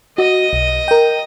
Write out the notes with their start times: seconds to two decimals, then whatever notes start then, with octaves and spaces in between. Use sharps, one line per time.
0.18 F#4 D#5
0.53 B1
0.88 A#4 G5